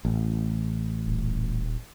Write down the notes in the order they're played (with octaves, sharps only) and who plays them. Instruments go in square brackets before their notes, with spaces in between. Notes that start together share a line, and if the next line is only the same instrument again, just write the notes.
[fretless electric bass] A1
[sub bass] D#1